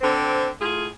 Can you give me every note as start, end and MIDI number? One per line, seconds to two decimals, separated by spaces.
0.01 0.47 50
0.01 0.47 60
0.59 0.86 45
0.59 0.86 65
0.59 0.86 68